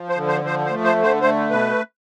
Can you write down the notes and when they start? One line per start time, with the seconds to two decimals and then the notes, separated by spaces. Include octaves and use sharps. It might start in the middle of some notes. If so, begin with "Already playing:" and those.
Already playing: F3
0.09 C5
0.16 D3
0.28 C5
0.44 F3 C5
0.65 C5
0.70 A3
0.84 C5
0.98 D3
1.03 C5
1.21 A3 C5
1.50 B2 B4